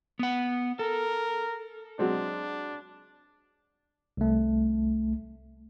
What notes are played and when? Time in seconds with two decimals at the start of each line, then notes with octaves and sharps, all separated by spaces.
0.19 B3 F#5
0.79 A4 A#4
1.99 F#3 G#3 C4 D4
4.17 C2 A3